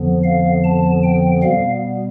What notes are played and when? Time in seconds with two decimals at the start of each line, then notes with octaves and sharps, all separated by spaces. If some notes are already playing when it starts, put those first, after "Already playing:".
Already playing: F2 D3 F3 B3
0.24 F5
0.64 A5
1.03 G5
1.43 B2 G3 B3 F5